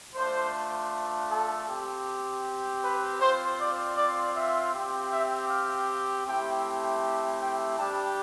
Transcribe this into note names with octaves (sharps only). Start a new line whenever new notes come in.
A3 D4 F4 C5
A4
C4 G4
B4
C4 F4 C5
D5
D5
E5
C4 G4
E5
F5
A3 C4 E4 G4 G5
G5
G3 D4 G4 A5